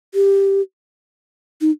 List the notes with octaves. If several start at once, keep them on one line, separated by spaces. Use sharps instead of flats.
G4
D#4